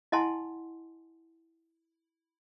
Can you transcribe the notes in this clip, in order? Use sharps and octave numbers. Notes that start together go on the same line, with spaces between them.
E4 D#5 F#5 G#5 A5 C6